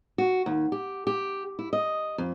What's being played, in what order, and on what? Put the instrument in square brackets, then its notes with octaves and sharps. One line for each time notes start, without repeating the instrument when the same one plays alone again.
[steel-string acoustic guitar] F#4
D#2
G4
G4
E4
D#5
F2